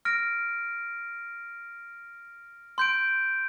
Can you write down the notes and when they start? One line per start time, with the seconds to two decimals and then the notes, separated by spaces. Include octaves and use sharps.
0.05 F6 A#6 D7
2.78 C6 G6 D7